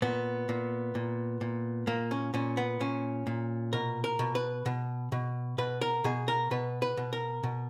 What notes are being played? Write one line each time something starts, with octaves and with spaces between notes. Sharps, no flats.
A#2 B3
A#2
A#2
A#2
A#2 A#3
C#4
A#2 C#4
B3
A#2 C#4
A#2
B2 A#4
A#4
B2
B4
B2
B2
B2 B4
A#4
B2 G#4
A#4
B2 B4
B4
B2
A#4
B2